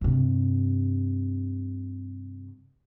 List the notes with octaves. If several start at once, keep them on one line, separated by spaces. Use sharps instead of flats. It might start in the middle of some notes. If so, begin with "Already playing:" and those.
G2 C3